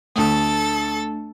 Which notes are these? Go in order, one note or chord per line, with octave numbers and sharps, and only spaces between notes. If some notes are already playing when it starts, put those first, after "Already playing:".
D2 A3 D4 A4 D#6 A6